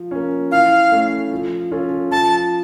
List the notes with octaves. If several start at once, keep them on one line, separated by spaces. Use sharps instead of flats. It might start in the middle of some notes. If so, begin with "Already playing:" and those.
Already playing: F3
A#3 C#4
E3 F5
A3 C#4
F3
C#4 F4 A4
F3 A5